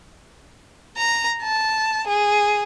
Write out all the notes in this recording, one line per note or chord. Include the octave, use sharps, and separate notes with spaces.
A#5
A5
G#4